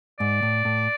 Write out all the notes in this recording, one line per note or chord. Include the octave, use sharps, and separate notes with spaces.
G#2 D5
A2
A2